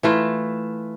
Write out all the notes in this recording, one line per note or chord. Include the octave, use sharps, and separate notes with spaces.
E3 A3 F4